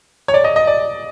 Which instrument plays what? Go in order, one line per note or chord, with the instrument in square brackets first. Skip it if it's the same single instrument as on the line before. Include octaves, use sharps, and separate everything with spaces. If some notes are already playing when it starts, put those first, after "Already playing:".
[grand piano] C#5
D5
D#5
D#5
D5